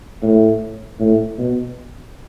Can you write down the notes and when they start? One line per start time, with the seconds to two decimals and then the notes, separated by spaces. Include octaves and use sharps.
0.22 A2
1.00 A2
1.39 B2